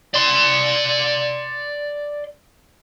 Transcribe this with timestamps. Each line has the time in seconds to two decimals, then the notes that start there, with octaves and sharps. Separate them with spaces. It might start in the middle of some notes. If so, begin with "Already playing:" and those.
0.14 D5 C6